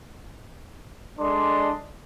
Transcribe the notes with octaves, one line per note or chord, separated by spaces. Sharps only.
G#3 D4 A4 D5 D#5 C6